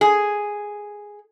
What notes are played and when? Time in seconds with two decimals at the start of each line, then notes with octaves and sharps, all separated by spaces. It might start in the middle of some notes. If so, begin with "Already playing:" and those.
0.01 G#4